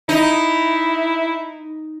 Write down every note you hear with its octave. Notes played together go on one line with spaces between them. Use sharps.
D#4 E4